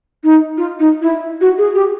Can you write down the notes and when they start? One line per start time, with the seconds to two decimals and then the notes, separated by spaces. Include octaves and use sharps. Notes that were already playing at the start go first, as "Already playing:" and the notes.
0.24 D#4
0.57 F4
0.80 D#4
1.02 E4
1.41 F#4
1.58 G#4
1.75 G4